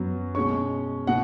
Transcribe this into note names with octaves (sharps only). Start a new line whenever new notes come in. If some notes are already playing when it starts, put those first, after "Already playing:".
Already playing: F#2 F#3 B3
B2 G#3 C#4 C#6
B2 F#5